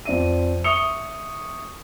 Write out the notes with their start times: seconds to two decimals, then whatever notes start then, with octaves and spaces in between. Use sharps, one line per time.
0.05 F2 D5 D#7
0.64 E5 C#6 D#6 C#7 F7 G7